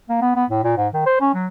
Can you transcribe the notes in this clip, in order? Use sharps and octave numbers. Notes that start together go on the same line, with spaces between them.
A#3
B3
B3
A2
A#2
G#2
D#3
C5
C#4
F#3